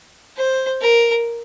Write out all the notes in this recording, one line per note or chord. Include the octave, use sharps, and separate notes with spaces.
C5
A#4